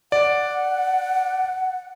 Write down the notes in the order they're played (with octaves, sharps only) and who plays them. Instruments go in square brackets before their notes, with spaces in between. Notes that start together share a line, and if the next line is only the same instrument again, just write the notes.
[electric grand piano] D5 [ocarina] F#5